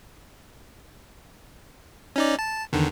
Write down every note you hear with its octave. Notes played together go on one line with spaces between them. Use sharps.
C#4 D#4 D5
A5
E2 D3 D#3